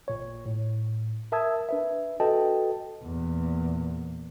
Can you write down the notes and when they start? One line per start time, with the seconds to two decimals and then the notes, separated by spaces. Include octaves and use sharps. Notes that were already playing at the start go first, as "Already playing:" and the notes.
0.08 A1 A#2 C#5
0.46 A2
1.32 A#4 E5 A5 D#6 E6 G#6
1.69 D4 B4 E5
2.20 F#4 A4 B4 D#5 G5 A5
3.04 E2 A#2